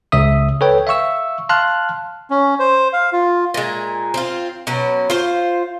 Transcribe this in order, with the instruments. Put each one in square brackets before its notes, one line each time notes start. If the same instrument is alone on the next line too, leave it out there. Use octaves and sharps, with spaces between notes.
[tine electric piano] C#2 C#3 E5 D#6
A4 B4 C#5 G5
E5 F5 C#6 E6
F5 A5 C6 F6 F#6
[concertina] C#4
C5
F5
F4
[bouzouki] A#2 G#3
C4 F4
B2 F#3 C#4
F4 C5